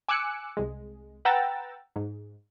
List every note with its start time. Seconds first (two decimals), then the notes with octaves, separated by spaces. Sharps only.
0.09 G#5 D6 E6 F#6 C#7
0.57 C2 G#3
1.25 B4 F#5 G5 A#5 E6 A6
1.96 G#2